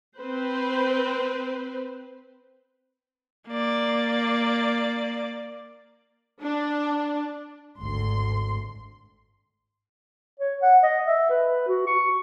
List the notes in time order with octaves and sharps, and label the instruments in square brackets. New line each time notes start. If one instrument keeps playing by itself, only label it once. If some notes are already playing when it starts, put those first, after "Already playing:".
[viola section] C4 B4 C5
[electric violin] A#3 D5
[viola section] D4
[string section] G#1 D2 C6
[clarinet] C#5
F#5
D#5
E5
B4
F#4
C#6